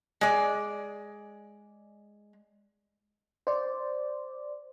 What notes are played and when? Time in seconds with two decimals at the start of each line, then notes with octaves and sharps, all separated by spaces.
0.21 G#3 D5
3.47 C5 D5